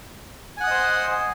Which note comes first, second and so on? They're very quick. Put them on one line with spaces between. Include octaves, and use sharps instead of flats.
G#5 F#5 D#6 D#5 C5